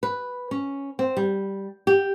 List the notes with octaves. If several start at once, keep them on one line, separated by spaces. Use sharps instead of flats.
B4
C#4
C4
G3
G4